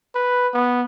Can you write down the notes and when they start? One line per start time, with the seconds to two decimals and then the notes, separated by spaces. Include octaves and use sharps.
0.15 B4
0.54 B3